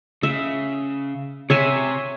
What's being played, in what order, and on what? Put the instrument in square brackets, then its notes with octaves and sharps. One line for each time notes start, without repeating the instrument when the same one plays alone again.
[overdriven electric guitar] C#3 [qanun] E5
[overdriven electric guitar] C3 [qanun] C#5 E5 G#5